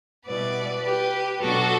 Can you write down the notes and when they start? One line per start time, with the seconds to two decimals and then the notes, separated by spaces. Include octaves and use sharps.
0.26 B2 G3 B3 E4 B4 D5
0.83 G4 B4
1.41 B2 F#3 B3 D4 F#4 A4